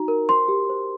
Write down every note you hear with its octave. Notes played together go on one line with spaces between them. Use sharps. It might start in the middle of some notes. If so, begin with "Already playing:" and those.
Already playing: D#4 F#4 A#5
A#4
C5 C6
G4
C5